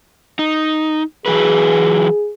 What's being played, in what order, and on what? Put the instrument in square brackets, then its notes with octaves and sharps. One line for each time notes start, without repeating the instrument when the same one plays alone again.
[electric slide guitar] D#4
[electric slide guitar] E3 F#3 B4 [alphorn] G#4